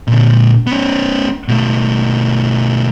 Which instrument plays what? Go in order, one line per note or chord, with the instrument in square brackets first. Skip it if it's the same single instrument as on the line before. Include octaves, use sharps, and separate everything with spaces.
[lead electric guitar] A#2 D3
B3 C#4
B2 A3